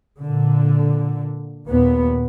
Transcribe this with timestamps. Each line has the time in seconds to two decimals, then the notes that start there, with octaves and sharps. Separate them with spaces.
0.21 A#2 D3
1.67 D#2 A#2 B3